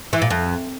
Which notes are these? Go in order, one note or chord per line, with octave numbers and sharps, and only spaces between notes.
E3
A#2
F2